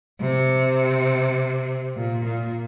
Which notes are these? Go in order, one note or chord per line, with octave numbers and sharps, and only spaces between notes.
C3
A#2
A#2